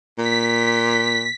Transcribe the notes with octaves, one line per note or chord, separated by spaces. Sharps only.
A#2 B6